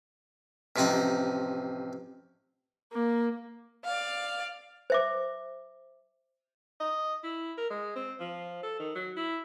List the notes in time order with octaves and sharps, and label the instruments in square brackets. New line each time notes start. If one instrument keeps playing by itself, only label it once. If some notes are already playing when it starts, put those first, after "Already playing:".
[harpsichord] A1 C3 F3 D#4 D#5 F#5
[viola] A#3
[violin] D5 F5
[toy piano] C5 E5 D6
[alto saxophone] D#5
E4
A#4
G#3
C4
F3
A4
D#3
F#3
E4